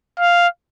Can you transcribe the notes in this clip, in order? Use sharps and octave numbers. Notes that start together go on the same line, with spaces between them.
F5